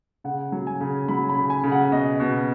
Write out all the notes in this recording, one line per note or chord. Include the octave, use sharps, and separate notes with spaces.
C#3 F#5
F#3
G#5
C#3
F#3 B5
B5
C#3
G#5
C#3
F#5
B2 D#5
B2